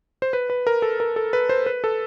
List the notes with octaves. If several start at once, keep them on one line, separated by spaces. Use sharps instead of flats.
C5
B4
B4
A#4
A4
A#4
A4
B4
C5
B4
A4